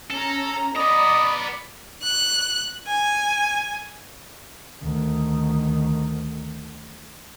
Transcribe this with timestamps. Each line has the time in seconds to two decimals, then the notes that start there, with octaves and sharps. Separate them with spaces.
0.11 C#4 A4 A#5
0.76 B3 D5 D#5 A#5 B5
2.02 F#6
2.87 G#5
4.82 D2 D#3